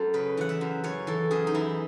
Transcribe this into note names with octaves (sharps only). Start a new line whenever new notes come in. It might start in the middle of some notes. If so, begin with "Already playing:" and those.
Already playing: F#2 A4
C#3 B4
E3 F#5
E5
F#2
F#2 C#5
E3 A4
F#2 G#4
D#4
E3 E4